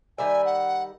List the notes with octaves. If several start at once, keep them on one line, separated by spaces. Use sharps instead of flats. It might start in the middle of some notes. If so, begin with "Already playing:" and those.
D#3 G3 E5 G#5
F#5